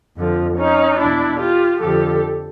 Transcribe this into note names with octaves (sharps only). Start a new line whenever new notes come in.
F2 D3 F3
C#4 D#4
E2 B2 D4 E4
F4 G4
F2 D3 F3 G4 A4